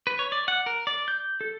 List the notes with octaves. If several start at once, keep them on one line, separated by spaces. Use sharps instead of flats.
B4
C#5
D5
F#5
A#4
D5
G6
A4